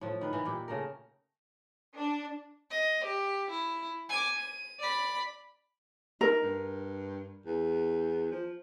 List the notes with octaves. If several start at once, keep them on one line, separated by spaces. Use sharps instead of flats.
A2 F3
D#3 B4
E3 B3 D#4
A#2 G4
C#3 A3 A#4
D4
D#5
G4
E4
G#5 D6
D#7
D5 B5
D#4 A#4
G2
E2
F3